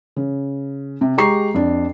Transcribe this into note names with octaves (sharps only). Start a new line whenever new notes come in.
C#3
C3
G#3 G4 A#5 C#6 C7
F2 D4